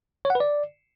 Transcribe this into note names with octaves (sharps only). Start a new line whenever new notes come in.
C#5
F#5
B4
D5